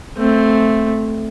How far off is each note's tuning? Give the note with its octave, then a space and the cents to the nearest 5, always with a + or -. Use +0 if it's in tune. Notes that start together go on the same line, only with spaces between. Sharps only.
A3 +0 C4 +0